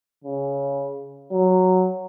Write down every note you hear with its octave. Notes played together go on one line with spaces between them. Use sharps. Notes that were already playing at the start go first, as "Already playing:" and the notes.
C#3
F#3